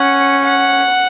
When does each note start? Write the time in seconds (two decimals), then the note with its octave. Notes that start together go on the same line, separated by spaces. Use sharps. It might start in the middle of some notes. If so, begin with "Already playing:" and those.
Already playing: C#4 F#5
0.45 F#5